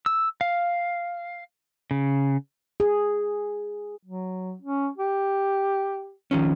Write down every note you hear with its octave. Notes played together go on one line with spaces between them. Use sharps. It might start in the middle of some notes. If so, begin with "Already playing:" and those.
E6
F5
C#3
G#4
F#3
C#4
G4
D#3 F3 C#4